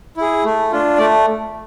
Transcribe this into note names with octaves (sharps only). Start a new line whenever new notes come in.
E4 G#4
A3
D4 F4
A3 D5